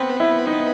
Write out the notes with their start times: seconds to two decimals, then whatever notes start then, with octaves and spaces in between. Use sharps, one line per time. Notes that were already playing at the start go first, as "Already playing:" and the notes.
Already playing: B3 C4 B4
0.20 E4
0.47 D#4